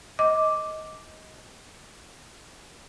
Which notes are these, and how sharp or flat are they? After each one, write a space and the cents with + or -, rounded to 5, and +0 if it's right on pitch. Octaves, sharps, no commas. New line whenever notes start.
D#5 +15 D6 +0